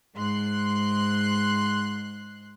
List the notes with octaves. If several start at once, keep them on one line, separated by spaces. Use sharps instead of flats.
G#2 C6 F#6 C7